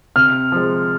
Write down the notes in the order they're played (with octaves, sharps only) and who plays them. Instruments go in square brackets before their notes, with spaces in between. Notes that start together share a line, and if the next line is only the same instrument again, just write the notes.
[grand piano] C3 F6
F3 G#3